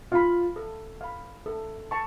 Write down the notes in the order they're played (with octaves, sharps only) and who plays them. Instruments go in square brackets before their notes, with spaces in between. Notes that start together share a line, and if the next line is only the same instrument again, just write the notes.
[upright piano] F4 [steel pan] F5 B5
[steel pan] A4
F5 B5
A4
A5 C#6